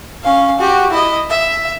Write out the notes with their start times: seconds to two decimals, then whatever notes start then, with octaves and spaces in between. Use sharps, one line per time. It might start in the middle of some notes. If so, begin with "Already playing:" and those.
0.23 C#4 F5
0.59 F#4 G4
0.91 E4 D#5
1.30 E5